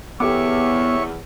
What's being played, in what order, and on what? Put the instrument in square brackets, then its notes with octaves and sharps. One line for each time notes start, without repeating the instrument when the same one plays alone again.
[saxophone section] E2 [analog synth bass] B3 [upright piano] G4 A4 D6 [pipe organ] C#5 E5 C#6